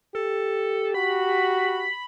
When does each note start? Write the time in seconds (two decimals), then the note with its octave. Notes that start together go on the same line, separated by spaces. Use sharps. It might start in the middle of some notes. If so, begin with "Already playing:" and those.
0.15 G4 A4
0.94 F#4 B5